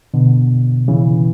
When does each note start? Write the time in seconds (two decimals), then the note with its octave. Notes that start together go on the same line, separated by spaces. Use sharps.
0.14 B2 D3
0.88 C#3 E3